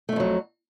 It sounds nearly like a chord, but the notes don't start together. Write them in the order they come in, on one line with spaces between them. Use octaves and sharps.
A3 G#2 F2 F#3